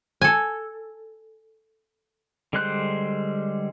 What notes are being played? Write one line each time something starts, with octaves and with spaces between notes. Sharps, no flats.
A4 G#5
D3 G3 G#3 C5 F#6